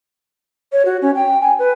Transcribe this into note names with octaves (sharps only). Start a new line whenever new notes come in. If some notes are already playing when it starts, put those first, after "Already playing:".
C#5
F#4
C#4
G5
G#5
B4